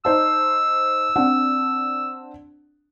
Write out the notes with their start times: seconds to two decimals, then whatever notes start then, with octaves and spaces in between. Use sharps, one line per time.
0.05 D#4 C5 A5 E6
1.16 C4 D4 F#5